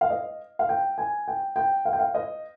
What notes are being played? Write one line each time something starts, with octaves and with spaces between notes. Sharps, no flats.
F5
D#5
F5
G5
G#5
G5
G5
F5
G5
F5
D#5